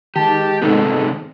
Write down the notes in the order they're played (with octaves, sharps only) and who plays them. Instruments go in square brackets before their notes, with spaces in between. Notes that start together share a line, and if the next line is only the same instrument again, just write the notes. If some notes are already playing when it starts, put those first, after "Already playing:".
[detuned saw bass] D#3 [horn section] G#3 A5 [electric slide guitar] G4
[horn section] G#2 A4 [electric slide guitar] C3 D#3 B3 [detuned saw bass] G#3